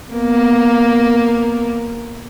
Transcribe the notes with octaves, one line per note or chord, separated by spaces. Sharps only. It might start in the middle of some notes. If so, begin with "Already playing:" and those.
A#3 B3